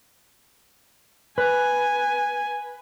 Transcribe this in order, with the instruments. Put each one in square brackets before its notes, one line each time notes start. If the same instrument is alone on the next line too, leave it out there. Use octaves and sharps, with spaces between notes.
[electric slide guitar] B4 [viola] G#5